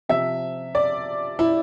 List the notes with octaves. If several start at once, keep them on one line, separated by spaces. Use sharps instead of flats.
C3 F3 E5
D5
E4